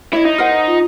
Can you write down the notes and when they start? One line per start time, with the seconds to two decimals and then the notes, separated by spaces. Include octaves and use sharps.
0.13 E4 C#5 D#5
0.25 D#4
0.38 A#4 C5 F#5
0.67 F4